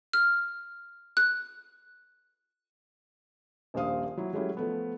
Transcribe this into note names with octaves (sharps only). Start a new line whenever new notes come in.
F6
F#6
D#1 A#1 A#2 C5 F5 D#6
F#3 E4
F#3 G#3 A3 C#4 E4 G4
F3 A3 B3